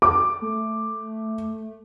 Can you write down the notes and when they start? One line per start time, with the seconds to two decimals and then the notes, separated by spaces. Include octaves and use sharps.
0.02 D6
0.42 A3